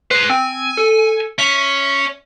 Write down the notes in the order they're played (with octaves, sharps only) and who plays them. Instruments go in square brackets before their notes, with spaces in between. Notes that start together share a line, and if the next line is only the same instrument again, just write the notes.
[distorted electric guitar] G#4 C5 [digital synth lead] B4
[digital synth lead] C4 [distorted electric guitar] G#5
[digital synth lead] A4
[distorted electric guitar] C#4 [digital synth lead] E5